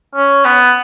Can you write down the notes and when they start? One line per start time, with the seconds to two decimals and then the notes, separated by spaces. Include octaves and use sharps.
0.15 C#4
0.45 B3